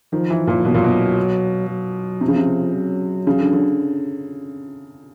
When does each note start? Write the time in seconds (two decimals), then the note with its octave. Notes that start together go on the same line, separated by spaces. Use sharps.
0.13 D#3 F3
0.30 E3
0.47 A#2
0.64 B2 F#3
0.74 A#2
0.84 B2
1.70 F#3
2.21 C3 F3
2.28 C#3
2.36 C3
2.73 F#3
3.27 C#3
3.40 D3
3.52 D3